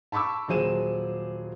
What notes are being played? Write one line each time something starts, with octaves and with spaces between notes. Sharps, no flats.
A5 B5 C#6 D6 E6
D#1 F#3 G#4 C5 D#7 E7